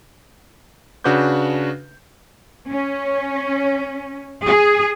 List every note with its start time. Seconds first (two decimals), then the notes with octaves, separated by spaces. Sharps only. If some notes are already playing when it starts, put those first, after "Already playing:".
1.04 C#3 D4 F#4 B4 D6 G6
2.70 C#4
4.45 G#4